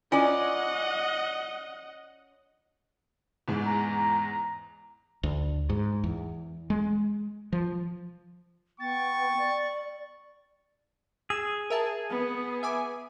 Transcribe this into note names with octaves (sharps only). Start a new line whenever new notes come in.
C#4 E4 F4 D5 D#5 F#5 G#5
E2 G#2
A#5
D2
G#2
E2
G#3
F3
B3 G5 C#6 A6
D5
G#4 E6
A#4 E5 A5
B3
E5 G#5 D6